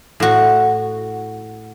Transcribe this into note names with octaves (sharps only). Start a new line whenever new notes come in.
A2 F#4